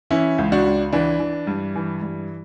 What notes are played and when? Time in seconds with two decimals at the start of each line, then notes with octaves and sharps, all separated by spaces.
0.11 E3 C#4 E4
0.38 C#2
0.52 D4 F#4
0.66 C#2
0.93 E3 D4
1.20 E3
1.47 G2
1.75 E3
2.02 G2